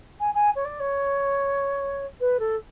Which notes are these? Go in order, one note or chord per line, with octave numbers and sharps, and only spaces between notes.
G#5
G#5
C#5
D5
C#5
B4
A4